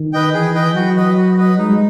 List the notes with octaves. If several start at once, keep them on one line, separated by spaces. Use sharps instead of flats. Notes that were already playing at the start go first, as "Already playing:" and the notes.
Already playing: D#3
B4 D#5 G5
E3 G#4
B4 D#5 G5
F#3 F#4
B4 D#5
F#4
B4 D#5
G#3 D#4